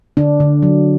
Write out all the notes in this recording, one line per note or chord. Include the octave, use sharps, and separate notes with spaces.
D3 D4
D3
F#3